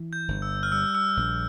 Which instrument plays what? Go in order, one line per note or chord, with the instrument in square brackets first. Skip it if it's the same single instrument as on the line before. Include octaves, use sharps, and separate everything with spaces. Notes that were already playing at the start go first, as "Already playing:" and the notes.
Already playing: [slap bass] E3
[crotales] G6
[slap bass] G1
[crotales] E6
F6
[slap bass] G3 [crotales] E6
[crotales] E6
[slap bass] A#1